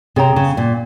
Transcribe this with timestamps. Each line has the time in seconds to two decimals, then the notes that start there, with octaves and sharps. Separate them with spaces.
0.16 C3 G#4 C#5 G5 A#5
0.36 C#3
0.57 A#2